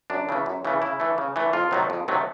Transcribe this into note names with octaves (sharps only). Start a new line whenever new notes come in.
F#2 D4
C#3 E3 A3
F#2
C#3 E3 A3
C#3 E4
E3 A3
C#3
E3 A3
F2 F4
C3 D#3 F#3 A3
F2
C3 D#3 F#3 A3